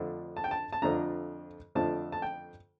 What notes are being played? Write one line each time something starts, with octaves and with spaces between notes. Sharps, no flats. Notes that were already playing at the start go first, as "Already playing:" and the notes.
Already playing: F2 D3 F3 A3 D4
A5
G5
A5
A5
F2 D3 F3 A3 D4 A#5
F2 D3 F3 A3 D4 A5
A5
G5